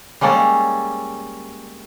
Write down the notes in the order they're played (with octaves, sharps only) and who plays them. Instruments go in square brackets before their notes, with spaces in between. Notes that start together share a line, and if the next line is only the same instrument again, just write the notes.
[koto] G3 G#3 A#3 C#4 A4